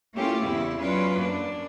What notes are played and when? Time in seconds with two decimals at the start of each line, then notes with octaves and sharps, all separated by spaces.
0.15 A3 A#3 C#4 E4 F4 G4
0.44 E2 G#2 C#3 C4 E4
0.80 F#3 C#4 F4 B4 D5
1.16 F#2 A#3 D4